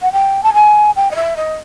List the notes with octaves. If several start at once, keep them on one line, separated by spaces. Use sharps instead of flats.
F#5
G5
A5
G#5
G5
D#5
E5
D#5